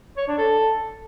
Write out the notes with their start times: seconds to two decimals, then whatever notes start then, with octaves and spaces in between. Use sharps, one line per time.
0.17 C#5
0.28 D4
0.38 A4